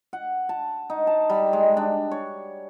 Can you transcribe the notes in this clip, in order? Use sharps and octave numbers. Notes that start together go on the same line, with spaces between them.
F#5
A5
D#4
A5
G3
G#3
D4
C#5